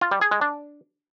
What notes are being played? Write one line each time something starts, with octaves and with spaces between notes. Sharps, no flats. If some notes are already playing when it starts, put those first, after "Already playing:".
F4
G3
G#4
G#3
D4